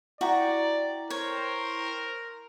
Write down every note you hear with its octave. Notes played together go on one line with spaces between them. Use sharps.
E4 F#4 D5 G5 A#5
A#4 C5 C#5